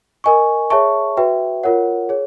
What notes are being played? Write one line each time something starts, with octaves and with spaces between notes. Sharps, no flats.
A#4 D#5 G#5 C#6
G#4 C#5 E5 A5 C#6
F#4 B4 E5 G5
F4 A#4 C#5 F#5
G#4 C#5